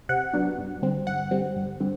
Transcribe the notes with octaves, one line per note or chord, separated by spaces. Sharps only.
C3 F#5
F#3 B3 D4
G2
D3 G3 C4
G2 F#5
D3 G3 C4
G2
D3 G3 C4